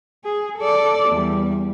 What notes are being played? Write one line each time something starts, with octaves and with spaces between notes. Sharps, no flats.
G#4
A4 D5
E2 G3